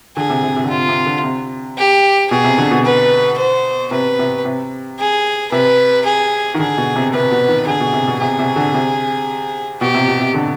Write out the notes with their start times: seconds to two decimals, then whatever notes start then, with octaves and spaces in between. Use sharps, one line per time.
0.17 D3 G#4
0.30 C3
0.43 C3
0.56 C3
0.64 D3
0.70 C3 F4
0.89 C3
1.06 D3
1.24 C3
1.78 G4
2.30 B2 G#4
2.44 C3
2.58 D3
2.71 B2
2.85 B4
3.39 C5
3.91 C3 B4
4.19 C3
4.45 C3
4.99 G#4
5.52 C3 B4
6.05 G#4
6.54 D#3
6.59 D3 G#4
6.78 B2
6.96 C3
7.14 C3 B4
7.31 B2
7.48 D#3
7.67 D3 G#4
7.80 B2
7.93 C3
8.08 B2
8.20 C3 G#4
8.39 C3
8.56 D3
8.74 C3
9.81 B2 G4
9.94 C3
10.08 B2
10.21 C3
10.34 D3